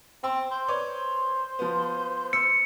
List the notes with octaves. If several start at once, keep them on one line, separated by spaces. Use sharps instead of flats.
C4 C6 E6
C5
B4 C#5 D5
F3 B3
E6 C#7